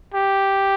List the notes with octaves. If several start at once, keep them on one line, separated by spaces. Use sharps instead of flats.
G4